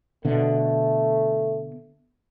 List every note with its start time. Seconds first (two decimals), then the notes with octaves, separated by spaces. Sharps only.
0.25 B2 D3 A3